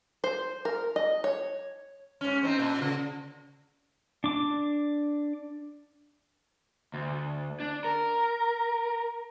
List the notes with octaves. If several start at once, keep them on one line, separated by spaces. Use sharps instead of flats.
C5
A#4
D#5
C#5
G#2 C#4
C4 D4 D#4
A#2
C#3
D4 D6
D2
D4
A#4